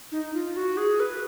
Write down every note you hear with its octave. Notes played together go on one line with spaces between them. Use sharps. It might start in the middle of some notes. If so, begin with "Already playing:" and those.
D#4
F4
F#4
G#4
B4